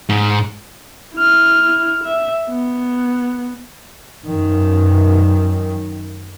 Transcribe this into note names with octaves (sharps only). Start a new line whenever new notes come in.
G#2
E4 F6
E5
B3
F#2 D#3